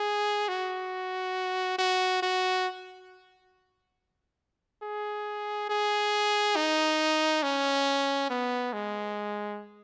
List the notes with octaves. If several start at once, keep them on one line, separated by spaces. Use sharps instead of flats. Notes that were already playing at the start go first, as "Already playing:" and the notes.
Already playing: G#4
F#4
F#4
F#4
G#4
G#4
D#4
C#4
B3
G#3